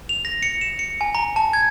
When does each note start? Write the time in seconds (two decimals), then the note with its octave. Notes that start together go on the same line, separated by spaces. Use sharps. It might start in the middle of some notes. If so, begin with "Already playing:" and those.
0.09 F7
0.25 A#6
0.43 C#7
0.61 E7
0.79 C#7
1.01 G#5
1.15 A#5
1.36 A5
1.53 G#6